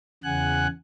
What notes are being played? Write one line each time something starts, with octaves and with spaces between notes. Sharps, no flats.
E2 C#3 F#5 G#5 F#6